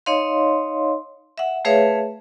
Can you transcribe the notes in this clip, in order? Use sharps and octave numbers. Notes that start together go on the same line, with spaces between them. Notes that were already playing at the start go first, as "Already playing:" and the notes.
D#4 C#5 D#5 F5 C6
E5 F#5
A3 G#4 B4 C#5 E5 F5